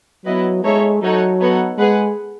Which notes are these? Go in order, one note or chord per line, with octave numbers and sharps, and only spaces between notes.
F#3 B3 E4 B4 D#5
G#3 D#4 A4 C#5 E5
F#3 A3 D#4 A4 C#5 F#5
B3 D#4 A4 C#5 F#5
G#3 G#4 B4 F#5